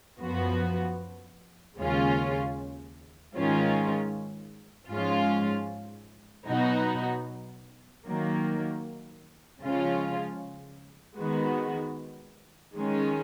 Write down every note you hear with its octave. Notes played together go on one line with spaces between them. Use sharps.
F#2 F3 B3 F#4
D#2 C#3 G#3 C#4 F4
G#2 D#3 G#3 C#4 F4
G#2 F3 G#3 C#4 F4
B2 F#3 B3 D#4 F#4
D#3 F#3 A#3
C#3 F3 G#3 C#4 F4
D#3 G#3 B3 F#4
D#3 G#3 C#4